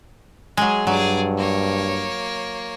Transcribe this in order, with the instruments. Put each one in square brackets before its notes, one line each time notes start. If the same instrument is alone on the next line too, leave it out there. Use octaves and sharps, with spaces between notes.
[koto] F#3 G#3 [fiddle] G#4
[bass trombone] G2 [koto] F#3 [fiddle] G#4 D5
[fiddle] A#3 C#5